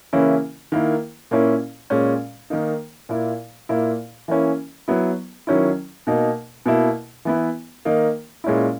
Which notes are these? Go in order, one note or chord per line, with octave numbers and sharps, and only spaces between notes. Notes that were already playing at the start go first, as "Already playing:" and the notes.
C#3 E3 A#3 C#4 E4
D#3 A#3 E4
A#2 A#3 C#4 E4
A#2 G#3 C#4
D#3 A#3 D#4
A#2 A#3 E4
A#2 A#3 E4
E3 A#3 C#4 E4
F#3 B3 E4
D#3 F#3 C#4 E4
B2 A#3 D#4
B2 A#3 E4
E3 B3 E4
D#3 A#3 D#4
A#2 G#3 C#4 E4